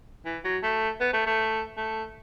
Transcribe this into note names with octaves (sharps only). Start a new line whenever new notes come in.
E3
F#3
A3
B3
A3
A3
A3